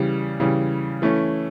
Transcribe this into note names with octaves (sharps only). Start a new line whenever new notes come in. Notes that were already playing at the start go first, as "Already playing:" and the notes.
Already playing: C#3 E3 G3
C#3 E3 G3
E3 A3 C#4